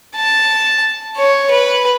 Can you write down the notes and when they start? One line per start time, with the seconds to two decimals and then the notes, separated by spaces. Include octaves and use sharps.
0.16 A5
1.17 C#5
1.51 B4